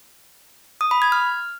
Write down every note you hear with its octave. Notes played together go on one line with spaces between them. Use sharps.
D#6
B5
G#6
F6